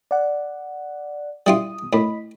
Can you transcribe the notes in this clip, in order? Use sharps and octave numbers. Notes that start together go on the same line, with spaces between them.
D5 F#5
G3 E4 F4 D#6
A2 D#5 B5